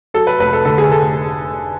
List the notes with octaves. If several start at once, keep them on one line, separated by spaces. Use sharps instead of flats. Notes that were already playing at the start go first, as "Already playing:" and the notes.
F#3 A4
B4
F1 B4
A4
D3 A4
G#4
A4